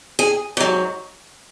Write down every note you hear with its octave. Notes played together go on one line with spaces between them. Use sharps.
G#4
G#2 F#3